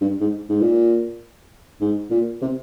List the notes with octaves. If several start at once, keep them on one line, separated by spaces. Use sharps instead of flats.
G2
G#2
G#2
A#2
G#2
A#2
C3